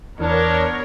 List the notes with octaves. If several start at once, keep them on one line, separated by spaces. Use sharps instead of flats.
E2 B3 D4 A#4 C#5